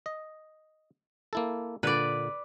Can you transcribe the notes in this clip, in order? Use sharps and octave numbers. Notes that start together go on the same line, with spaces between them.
D#5
A#3 E4 A4
A#2 D3 B4 D5